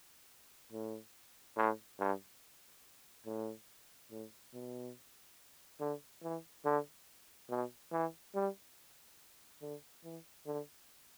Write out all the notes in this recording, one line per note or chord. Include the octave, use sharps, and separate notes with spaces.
A2
A2
G2
A2
A2
B2
D3
E3
D3
B2
E3
G3
D3
E3
D3